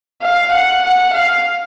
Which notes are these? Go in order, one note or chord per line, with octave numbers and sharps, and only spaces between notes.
F5
F#5
F#5
F5